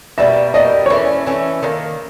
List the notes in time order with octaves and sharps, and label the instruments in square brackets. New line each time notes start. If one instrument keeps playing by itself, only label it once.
[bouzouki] B2 G3 A#3 [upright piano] E5
[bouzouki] B2 G3 A#3 [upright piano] D#5
[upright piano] C#5
[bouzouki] E3 A3 C#4 [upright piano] D5
[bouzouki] E3 A3 C#4
D#3 F#3 A#3